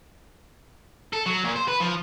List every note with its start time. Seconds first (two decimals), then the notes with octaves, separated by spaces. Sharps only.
1.13 A4
1.26 F#3
1.44 A#2
1.56 C5
1.68 B4
1.80 F3